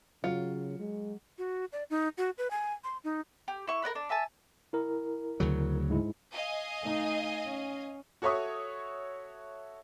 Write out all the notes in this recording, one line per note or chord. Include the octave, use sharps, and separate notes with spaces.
C#3 F#3 F4 C#7
G#3
F#4
D5
D#4
F#4
B4
G#5
C6
D#4
G4
E4 C#6
A#4 D5 F#5 B5
D4
E5 G#5 A5
E4 A#4
D2 C#3 F#3
G#2 G#3 E4
D#5 F5 G#5
A3 D#4
C#4
F#4 A4 C#5 E5 C#6 D#6